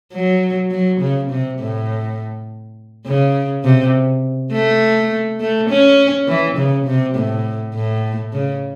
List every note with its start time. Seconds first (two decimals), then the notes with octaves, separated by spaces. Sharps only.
0.13 F#3
0.71 F#3
1.00 C#3
1.30 C3
1.59 A2
3.06 C#3
3.64 C3
4.52 A3
5.40 A3
5.70 C#4
6.28 E3
6.57 C#3
6.86 C3
7.15 A2
7.75 A2
8.33 C#3